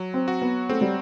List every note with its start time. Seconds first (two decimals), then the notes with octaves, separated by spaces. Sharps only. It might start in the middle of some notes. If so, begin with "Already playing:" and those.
Already playing: F#3
0.14 C4
0.28 F#4
0.41 B3
0.69 A3 C4
0.81 G3